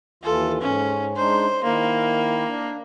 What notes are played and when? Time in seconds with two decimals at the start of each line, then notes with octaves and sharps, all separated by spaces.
0.23 D#2 E3 F4 A4
0.61 G#2 C#4
1.16 G#3 D4 D#4 C5
1.64 D#3 A#3 E4
2.46 D4